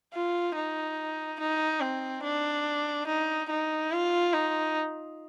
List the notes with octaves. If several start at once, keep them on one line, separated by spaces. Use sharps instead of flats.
F4
D#4
D#4
C4
D4
D#4
D#4
F4
D#4